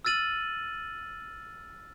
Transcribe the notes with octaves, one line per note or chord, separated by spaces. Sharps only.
E6 F6 A6 D#7 F#7